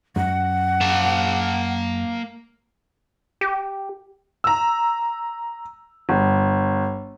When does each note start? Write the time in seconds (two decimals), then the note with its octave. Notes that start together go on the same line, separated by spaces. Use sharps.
0.16 F#2 F#5
0.81 A#3 A5
3.41 G4
4.44 A#5 E6
6.09 G1